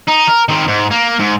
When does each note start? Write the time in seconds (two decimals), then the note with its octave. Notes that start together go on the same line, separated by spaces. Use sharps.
0.08 D#4
0.27 A#4
0.49 D#3 C4
0.68 G#2
0.91 A#3
1.20 G#2